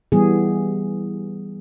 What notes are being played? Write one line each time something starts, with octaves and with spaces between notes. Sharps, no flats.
E3 G3 B3 G#4